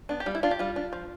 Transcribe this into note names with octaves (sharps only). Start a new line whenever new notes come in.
B3 D4
G4
G3 F4
E4
D4 F4
G4
G3 F4
D4
F3